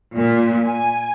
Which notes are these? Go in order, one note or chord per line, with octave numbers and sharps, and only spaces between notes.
A#2
G#5